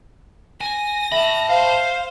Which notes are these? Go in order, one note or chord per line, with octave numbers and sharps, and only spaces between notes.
G#5 A#6
E5 A5 B5 F#7
C5 F5